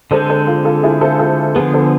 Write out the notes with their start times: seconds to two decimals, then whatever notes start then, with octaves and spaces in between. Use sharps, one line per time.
0.11 D3 G#3 C4 A4 C5
0.30 A4 C5
0.47 F4 A4
0.65 F4 A4
0.83 E4 G#4
1.01 A4 C5
1.19 F4 A4
1.55 D3 F3 B3 G#4 B4
1.73 A4 C5